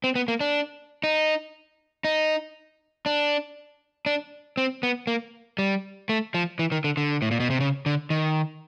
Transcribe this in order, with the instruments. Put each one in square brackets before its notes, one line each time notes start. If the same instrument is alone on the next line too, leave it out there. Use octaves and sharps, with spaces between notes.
[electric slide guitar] C4
B3
A#3
D4
D#4
D#4
D4
D4
C4
B3
A#3
G3
A3
F3
E3
D#3
D3
D3
A2
A#2
B2
C3
C#3
D3
D#3